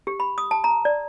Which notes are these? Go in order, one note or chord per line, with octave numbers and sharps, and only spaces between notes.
G4
B5
D#6
A5
A#5
D5